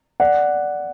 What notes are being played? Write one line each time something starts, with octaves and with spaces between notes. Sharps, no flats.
D5 F#5